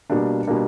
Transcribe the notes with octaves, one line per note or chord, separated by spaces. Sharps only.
B2 G3 A#3 D4
B2 G3 A#3 D4